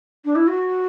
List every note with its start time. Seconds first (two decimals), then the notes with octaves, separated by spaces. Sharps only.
0.25 D4
0.35 E4
0.47 F#4